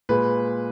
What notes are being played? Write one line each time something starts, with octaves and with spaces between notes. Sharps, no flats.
A#2 G#3 B4